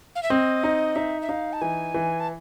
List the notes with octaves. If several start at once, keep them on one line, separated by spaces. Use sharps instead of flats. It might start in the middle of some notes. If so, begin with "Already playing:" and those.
F5
E5
C4 D#5
D#4
D#4 E5
E5
D#4 F5
A5
E3 G#5
E3
A5